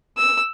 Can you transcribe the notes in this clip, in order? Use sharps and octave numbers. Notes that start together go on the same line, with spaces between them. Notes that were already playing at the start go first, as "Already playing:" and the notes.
E6